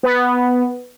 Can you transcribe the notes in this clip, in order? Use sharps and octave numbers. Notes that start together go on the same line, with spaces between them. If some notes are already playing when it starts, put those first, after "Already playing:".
B3